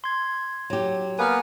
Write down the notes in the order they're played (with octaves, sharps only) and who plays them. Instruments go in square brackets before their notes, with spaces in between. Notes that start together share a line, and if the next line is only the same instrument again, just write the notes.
[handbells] C6 G#6
[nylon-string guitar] F#3 G4
[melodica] A#3 B3 B4 [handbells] G#5 F6